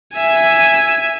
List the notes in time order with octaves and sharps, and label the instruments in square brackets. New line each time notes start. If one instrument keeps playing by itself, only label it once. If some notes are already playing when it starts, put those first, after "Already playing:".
[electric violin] E5 G#5